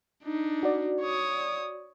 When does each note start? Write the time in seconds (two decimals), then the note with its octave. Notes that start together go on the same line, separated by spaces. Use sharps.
0.23 D4 D#4
0.63 F#4 D5
1.01 C#5 D#6